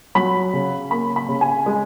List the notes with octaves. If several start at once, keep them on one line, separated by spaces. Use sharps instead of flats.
F#3 B5
C#3
A#3 B5
B5
C#3
G#5
G#3